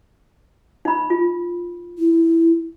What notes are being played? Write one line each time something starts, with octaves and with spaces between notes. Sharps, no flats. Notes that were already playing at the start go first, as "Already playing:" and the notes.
D#4 B5
F4
E4